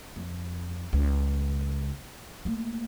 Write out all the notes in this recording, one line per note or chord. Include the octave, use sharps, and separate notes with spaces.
F2
C#2
A3 A#3